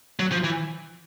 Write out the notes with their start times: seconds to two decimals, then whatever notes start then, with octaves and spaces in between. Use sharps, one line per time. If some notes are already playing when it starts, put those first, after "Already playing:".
0.19 F#3
0.32 F3
0.44 E3